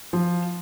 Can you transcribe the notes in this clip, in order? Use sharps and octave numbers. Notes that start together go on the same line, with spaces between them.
F3